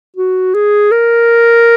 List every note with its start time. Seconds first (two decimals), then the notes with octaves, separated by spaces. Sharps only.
0.16 F#4
0.54 G#4
0.92 A#4